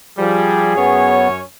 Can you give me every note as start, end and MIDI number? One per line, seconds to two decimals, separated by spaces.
0.19 0.74 53
0.19 0.74 55
0.19 1.29 68
0.77 1.41 42
0.77 1.28 59
0.77 1.41 61
0.77 1.41 73